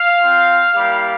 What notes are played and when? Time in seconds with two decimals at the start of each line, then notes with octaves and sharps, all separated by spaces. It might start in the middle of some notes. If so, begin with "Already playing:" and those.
Already playing: F5
0.21 C4 F4
0.75 G3 A#3 E4 G4